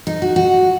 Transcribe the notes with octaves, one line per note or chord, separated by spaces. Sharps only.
D#4
F#4
F#4